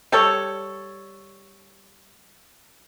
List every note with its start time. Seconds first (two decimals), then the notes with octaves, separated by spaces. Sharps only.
0.12 G3 A4 C#5